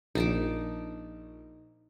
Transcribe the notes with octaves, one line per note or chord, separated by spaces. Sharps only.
A#1 D#4 A5 D6